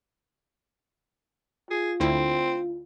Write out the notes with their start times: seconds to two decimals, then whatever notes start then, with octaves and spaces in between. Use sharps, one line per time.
1.71 F4 G#4
2.00 D2 D3 C4 E4